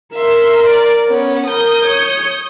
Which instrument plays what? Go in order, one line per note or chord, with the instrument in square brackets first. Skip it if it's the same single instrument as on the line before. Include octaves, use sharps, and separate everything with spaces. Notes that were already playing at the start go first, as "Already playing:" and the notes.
[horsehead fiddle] A#4 [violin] E5 C6
[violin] D5
B3 C#4
[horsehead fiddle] A#4 [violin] D#6 G6
[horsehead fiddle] C#5